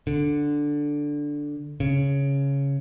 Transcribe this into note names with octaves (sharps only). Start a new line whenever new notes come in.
D3
C#3